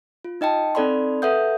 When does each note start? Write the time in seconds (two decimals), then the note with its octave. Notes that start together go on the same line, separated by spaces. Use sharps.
0.25 F4
0.41 D#4 D#5 G5 A5
0.75 C4 D#4 A4 D5 B5 C6
1.22 A4 B4 E5 F#5 D#6 G6